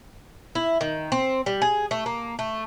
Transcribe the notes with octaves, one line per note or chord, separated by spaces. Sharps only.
E4
D#3
C4
G3
G#4
A3
A#3
A3